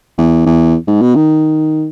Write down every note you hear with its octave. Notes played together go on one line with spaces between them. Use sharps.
E2
E2
G#2
B2
D#3